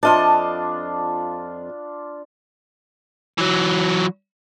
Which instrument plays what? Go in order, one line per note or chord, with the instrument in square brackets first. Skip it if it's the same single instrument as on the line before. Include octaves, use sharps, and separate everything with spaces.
[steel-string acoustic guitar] F2 D#5 A5 [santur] D4 F4
[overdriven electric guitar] E3 F#3